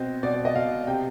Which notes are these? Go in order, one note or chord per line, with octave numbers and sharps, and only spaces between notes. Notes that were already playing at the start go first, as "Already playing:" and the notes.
Already playing: B2 C4 D#5
B2 D5
D5
D#5
B2 F5
C3 G5